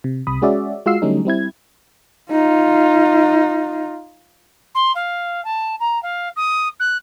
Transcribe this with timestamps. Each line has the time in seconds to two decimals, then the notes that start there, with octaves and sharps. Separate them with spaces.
0.04 C3
0.27 C2 C3 B5 D#6
0.42 G#3 C#4 F#4 G#4 D5 E5
0.86 G#3 F4 F#4 F5 E6 C7
1.02 D3 F#3 G3 A3 C#4 D#4
1.25 G3 C4 E4 G#6
2.31 D#4 F4
4.75 C6
4.95 F5
5.45 A5
5.80 A#5
6.03 F5
6.36 D#6
6.80 F#6